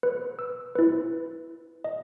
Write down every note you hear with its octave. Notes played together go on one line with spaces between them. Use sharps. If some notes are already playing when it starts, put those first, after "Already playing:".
B4
E6
E4 B4
D#5